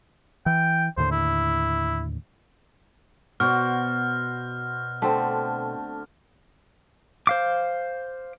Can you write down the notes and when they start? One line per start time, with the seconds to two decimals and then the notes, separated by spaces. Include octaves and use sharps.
0.46 E3 G5
0.97 D#2 A2 D3 C5
1.11 E4
3.40 B2 F#4 C5 D5 F6
5.02 D3 A3 C4
7.27 C5 F5 D6